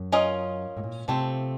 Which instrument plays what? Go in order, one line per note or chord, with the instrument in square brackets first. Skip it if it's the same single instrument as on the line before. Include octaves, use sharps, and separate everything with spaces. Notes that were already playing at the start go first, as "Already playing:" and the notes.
Already playing: [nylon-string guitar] F#2
[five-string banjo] C#4 F4 A#4 D#5
[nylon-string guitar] A2
A#2
[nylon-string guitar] C3 [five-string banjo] F3 A3 C4